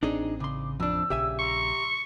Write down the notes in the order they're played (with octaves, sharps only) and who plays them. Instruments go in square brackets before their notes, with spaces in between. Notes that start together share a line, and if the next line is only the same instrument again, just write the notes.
[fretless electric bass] A1 C4 [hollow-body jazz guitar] D4 D#4 G#4
[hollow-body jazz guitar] C#3 C6 [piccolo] D6
[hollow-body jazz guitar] F2 D4 [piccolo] E6
[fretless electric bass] A#1 C#3 [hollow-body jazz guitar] G4 E5 G#5
[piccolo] A#5 [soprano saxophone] C#6